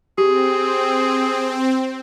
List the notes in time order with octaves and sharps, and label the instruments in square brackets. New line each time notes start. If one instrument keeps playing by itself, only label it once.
[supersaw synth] C4 [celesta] G4 [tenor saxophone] G#4